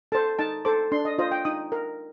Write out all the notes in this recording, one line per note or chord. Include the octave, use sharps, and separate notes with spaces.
A4 C5 A5
D#4 A5
A4 C5 D6
D4 C6
D#5
F4 C5 D#5
G5
D#4 D#6
A#4